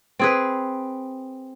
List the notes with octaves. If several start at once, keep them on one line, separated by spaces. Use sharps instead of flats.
C4 G#4 B4